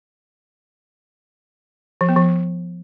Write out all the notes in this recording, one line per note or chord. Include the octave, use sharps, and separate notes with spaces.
F3
B3
F3